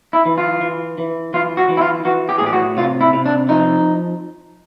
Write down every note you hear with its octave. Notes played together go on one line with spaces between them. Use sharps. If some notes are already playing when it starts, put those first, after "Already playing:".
E4
E3
F4
E3
E3
E3 F4
F#4
E3
E4
F4
E3 F#4
G4
G#4
A2
G4
F#4
C3 F4
E4
C3
D4
F3 D#4